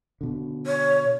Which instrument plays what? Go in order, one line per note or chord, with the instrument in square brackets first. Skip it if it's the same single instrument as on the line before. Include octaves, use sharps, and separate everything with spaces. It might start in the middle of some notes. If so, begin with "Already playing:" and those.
[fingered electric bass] B2 D3
[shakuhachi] C#5